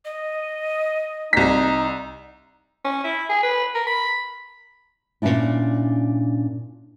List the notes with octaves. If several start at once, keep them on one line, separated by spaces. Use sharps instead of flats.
D#5
C2 D#4 B6
C#4
E4
G#4
B4
A#4
B5
A#2 A#3 C#4 D4 E4